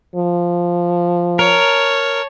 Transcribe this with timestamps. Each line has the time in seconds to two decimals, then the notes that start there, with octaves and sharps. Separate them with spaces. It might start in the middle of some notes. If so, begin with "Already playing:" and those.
0.15 F3
1.39 A#4 C#5 A5